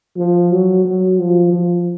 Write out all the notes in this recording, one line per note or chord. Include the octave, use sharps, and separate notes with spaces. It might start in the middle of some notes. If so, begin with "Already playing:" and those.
F3
F#3
F#3
F3
F3